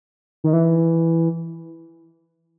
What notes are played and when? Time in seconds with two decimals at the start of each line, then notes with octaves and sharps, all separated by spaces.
0.44 D#3
0.53 E3